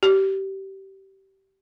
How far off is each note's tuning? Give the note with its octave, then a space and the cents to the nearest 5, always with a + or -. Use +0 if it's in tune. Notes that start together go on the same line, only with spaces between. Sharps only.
G4 -20